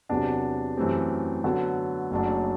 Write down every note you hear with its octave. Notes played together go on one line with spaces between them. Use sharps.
E2 C3 F#3 B3 D4
F#2 E3 A3 C4 G4
D3 F#3 B3 F#4
F#1 F#2 F#3 A3 D4